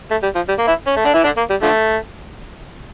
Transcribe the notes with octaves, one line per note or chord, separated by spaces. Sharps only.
A3
G3
F3
G3
A#3
E3 E4
C#4
A3
D3 D4
E3 E4
D3 D4
A#3
G3
D3 F3 A3